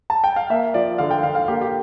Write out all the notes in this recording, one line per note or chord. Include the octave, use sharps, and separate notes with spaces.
A5
G5
F5
A#3 E5
F3 D5
D3 F5
G5
D3 F5
F5
A#3 G4
G4